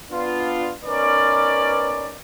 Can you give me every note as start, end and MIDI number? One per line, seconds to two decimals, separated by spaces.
0.11 0.71 59
0.11 0.71 62
0.11 0.71 65
0.84 2.15 59
0.84 2.15 61
0.84 2.15 63
0.84 2.15 70
0.84 2.15 71
0.84 2.15 74